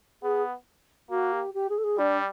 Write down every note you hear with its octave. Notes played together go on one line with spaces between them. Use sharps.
B3 G#4
A#3 F#4
G4
G4
G#4
A4
G#4
G3 D4